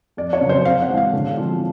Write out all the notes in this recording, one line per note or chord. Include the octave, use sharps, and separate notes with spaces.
F2 D5
C#5
C#3 F#3
C5
C3 F5
F#5
E3 G#3
F5
D3
F3 G#3 C4